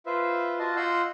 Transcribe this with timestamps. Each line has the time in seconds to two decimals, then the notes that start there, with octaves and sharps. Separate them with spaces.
0.06 F4 B4 C5 E5
0.59 F4 F#4 D#5 A5
0.76 F4 D#5 F#5 C6 E6 G6